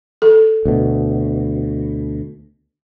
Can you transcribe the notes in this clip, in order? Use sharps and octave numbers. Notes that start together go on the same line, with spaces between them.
A4
D2 B2